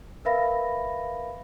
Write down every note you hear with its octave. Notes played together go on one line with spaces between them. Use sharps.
A#4 B4 E5 F5 B5 A#6